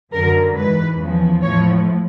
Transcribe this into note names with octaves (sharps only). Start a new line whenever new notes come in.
F#2 D3 F#3 A#4
G#2 E3 B4
E2 C#3 F3
A2 F3 C#5